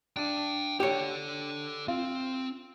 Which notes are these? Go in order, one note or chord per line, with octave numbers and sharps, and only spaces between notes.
D4 G5 A5
G4 A4 C#5 D5
C4 F4